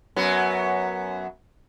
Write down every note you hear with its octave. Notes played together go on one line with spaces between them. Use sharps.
F#2 F#3 B3